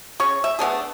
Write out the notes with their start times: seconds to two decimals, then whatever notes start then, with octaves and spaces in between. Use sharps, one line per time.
0.20 C#3 C#6
0.44 E5
0.59 A3 B3 D4 G#4